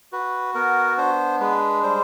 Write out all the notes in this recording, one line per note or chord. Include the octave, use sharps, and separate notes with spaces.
F#4 B4
B3 A#4
D4 C5
G#3 B4
G3 C5